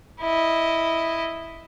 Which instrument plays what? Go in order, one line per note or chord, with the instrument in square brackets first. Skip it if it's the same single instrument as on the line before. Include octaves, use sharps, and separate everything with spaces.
[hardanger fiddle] E4 D#5